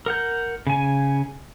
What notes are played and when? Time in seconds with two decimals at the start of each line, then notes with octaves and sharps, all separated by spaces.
0.06 A#4 F#5 G6
0.67 C#3 G#5